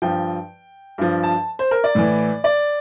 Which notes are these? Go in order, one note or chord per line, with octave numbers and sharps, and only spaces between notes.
G2 F3 G5
G2 F3
A5
C5
A#4
D5
A2 E3
D5